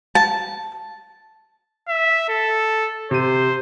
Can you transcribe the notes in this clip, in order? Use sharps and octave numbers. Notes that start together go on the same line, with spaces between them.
A5
E5
A4
C3 C5 D#7